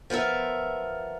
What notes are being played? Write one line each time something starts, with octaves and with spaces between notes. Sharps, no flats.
F3 B3 A#4 E5